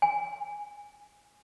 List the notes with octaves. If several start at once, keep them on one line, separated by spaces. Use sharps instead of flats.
G#5